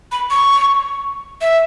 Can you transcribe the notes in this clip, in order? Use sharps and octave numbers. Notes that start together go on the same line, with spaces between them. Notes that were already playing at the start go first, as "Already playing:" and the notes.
B5
C#6
E5